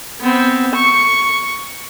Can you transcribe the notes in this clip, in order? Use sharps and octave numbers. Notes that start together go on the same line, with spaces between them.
B3 C4
C#6